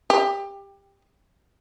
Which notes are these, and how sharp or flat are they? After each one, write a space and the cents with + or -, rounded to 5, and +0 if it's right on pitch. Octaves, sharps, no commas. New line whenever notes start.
G4 +20